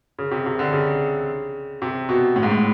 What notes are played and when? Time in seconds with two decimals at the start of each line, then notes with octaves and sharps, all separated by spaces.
0.19 C#3
0.31 C3
0.46 C3
0.59 D3
0.73 C#3
1.82 C3
2.09 B2
2.36 A2
2.43 G#2
2.51 A2